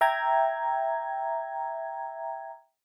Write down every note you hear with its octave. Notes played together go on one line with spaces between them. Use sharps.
E5 G5 A#5 G#6